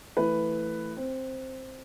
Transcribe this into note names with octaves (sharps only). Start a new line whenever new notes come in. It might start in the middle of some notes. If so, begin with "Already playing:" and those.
E3 A3 B4
C4